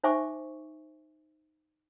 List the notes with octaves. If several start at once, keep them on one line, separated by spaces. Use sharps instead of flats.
D#4 C5 E5 G#5 C#6 D6